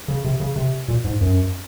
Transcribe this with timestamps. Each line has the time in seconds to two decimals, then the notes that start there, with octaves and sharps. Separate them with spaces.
0.08 C#3
0.24 C3
0.40 C#3
0.56 C3
0.88 A#2
1.04 G#2
1.21 F#2